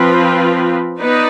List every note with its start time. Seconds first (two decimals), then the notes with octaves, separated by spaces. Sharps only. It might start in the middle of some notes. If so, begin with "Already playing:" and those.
Already playing: F3 C4 F4 B4
0.99 B3 D#4 B4 D5